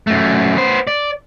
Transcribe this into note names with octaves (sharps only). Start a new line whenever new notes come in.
F#2 A3
B3 C5
D5